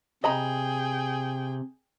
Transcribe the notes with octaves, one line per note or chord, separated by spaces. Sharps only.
C3 G#4 D#5 G5 A#5 B5